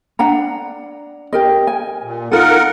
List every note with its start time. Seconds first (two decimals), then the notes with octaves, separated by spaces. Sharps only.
0.19 D4 F#5 A#5
1.33 G4 A#4 D#5
1.67 G#5
2.03 A#2
2.32 D#4 F4 A4 A#4 F#5